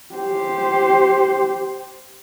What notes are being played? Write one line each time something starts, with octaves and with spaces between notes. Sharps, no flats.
G4 C5